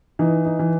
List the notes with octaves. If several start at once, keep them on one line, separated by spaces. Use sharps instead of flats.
E3 D#4
D#4
E3